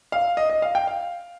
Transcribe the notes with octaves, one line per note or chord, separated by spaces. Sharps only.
F5
D#5
D#5
F5
G5
F5